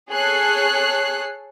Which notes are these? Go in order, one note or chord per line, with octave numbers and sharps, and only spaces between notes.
G#4 A4 C#5 F#6 C7